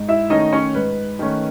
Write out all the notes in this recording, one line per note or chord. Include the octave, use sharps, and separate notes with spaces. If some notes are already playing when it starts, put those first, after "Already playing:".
Already playing: G#2
E4 E5
D#3 A3 C#4 D#4 D#5
C#4 C#5
G#2 B4
D#3 A3 C#4